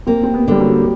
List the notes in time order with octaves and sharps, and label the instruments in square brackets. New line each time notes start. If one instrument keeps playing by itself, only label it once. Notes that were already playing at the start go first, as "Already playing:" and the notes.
[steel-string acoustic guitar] A#3 [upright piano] C4
[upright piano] C4
B3
[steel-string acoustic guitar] D3 [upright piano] G3
[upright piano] F#3